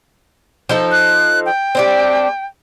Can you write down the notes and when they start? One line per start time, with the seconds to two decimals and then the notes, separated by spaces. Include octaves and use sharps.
0.69 F3 D#4 A4
0.91 F#6
1.46 G5
1.75 C4 D4 G4